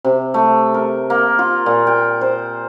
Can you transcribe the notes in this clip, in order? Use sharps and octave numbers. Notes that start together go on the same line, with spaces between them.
C3
A3
A#4
A#3
F4
A#2
G5
C5